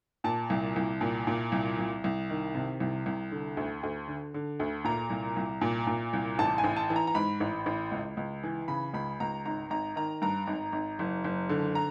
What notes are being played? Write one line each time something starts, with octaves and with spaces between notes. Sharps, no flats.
A#2 A5
C2
C2
A#2
A#2
C2
C2
C2
D#3
C3
C2
C2
D3
D2
D2
D3
D3
D2
A#2 A#5
C2
C2
A#2
A#2
C2
A1 A5
G#5
A1
A5
E3
A#5
A#5
G#2 B5
A1
A1
C#2
C#2
E3
C#3 B5
C#2 B5
C#2 A#5
G#1 A#5
G#1 A#5
D#3 A#5
G2 A#5
G#1
G#1
F#1
F#1
D3
A#5